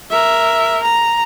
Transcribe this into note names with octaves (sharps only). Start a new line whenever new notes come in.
A#4 E5
A#5